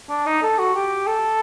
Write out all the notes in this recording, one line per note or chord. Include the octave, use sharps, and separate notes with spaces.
D4
D#4
A4
F#4
G4
A4